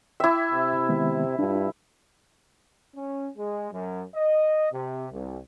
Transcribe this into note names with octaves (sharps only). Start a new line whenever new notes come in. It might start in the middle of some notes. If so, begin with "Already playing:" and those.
E4 E5 G5 D6
C3
D#3 G#3 B3
G2 D4 F4
C#4
G#3
F#2
D#5
C3
C2